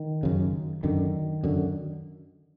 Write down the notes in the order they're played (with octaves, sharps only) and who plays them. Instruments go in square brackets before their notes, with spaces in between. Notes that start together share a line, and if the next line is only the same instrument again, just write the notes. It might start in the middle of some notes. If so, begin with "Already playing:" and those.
Already playing: [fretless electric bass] D#3
F#2 C#3
F#2 D3 D#3
F#2 D3